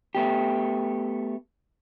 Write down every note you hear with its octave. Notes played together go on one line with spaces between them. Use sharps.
A3 B3 G4